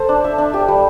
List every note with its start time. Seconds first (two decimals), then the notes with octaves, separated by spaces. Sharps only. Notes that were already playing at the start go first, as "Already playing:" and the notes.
Already playing: A4 C5
0.09 D4
0.24 E5
0.38 D4
0.54 G4
0.68 G3